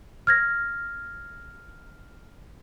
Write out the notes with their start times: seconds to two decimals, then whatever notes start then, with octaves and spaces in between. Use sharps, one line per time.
0.27 F6 G#6 A#6